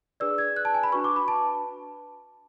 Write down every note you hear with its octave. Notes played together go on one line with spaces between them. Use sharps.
D4 G#4 B4 D5 E6
G#6
F#6
A5
G#5
B5
D4 F#4 B4 C#6
D6
B5
A5